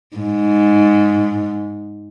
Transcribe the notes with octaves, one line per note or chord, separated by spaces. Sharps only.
G#2